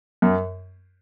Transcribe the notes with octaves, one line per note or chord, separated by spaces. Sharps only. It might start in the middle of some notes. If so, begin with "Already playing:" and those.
F#2